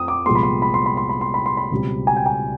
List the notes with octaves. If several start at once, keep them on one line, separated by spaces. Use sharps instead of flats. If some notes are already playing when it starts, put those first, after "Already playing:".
Already playing: F2 D#6
D6
C2 A#2 F3 G#3 B3 C6
B5
C6
B5
C6
B5
C6
B5
C6
B5
C6
B5
C#2 B2 G3 C4
G#5
G5
G#5